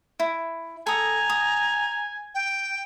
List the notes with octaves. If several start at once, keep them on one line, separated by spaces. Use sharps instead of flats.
E4
A4 G#5 A#5 D#6
D#6
G5